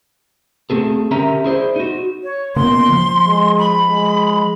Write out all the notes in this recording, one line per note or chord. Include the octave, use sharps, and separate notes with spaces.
A3 C4 G#4 A4
D3 C#4 G4 A#4 E5 A#5
E4 G#4 C5 D5
D#4 F#4
C#5
C#3 A#3 B3 C6
F3
G#3
B5
G#3